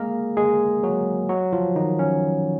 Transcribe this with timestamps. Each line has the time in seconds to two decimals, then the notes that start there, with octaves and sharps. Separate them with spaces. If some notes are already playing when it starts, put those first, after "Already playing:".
Already playing: G#3 A#3 G#4 A#4
0.37 G#3 G#4
0.83 F#3 F#4
1.29 F#3 F#4
1.53 F3 F4
1.75 D#3 D#4
1.99 C#4